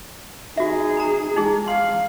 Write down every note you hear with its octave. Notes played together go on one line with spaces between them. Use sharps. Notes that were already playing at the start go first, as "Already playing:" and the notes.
D#4 F#4 G#4 E5
A#5 B5
G#3 D#4 E4 G#4
F5 C6